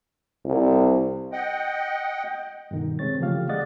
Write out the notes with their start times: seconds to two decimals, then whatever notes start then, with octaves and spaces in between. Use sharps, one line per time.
0.46 C2
1.32 D#5 F#5 G5
2.71 G2 B2 D#3
2.99 C3 G#3 C4 C#5 A6
3.19 C#3 E3 F3 A3 G4 F5
3.49 G#3 D5 D#5 F#5 A6